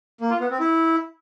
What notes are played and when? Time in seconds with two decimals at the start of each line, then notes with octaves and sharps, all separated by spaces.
0.21 A#3
0.30 F4
0.40 B3
0.50 C4
0.60 E4